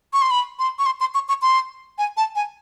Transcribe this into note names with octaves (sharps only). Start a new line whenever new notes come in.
C#6
C6
B5
C6
C#6
C6
C6
C#6
C#6
C6
G#5
A5
G#5